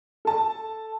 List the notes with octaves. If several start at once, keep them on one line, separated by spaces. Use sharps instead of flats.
A4 A5